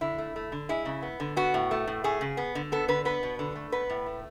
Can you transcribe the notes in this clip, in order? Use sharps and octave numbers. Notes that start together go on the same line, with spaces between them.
D3 E4
A3
A3
D3
G#3 E4
C#3
B3
D3
B3 F#4
A2
A3
A2
A3 G#4
C#3
B3
D3
B3 A4
D3 B4
B3 B4
B2
D3
A3
B3 B4
A2
A3